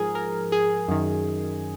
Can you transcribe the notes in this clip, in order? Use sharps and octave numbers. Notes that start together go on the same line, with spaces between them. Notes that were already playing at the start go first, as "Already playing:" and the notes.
Already playing: G#2 F3 G#4 A#4
A#4
G#4
F#2 D#3